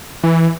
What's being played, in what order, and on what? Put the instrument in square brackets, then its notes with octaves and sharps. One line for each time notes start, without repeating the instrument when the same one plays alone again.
[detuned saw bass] E3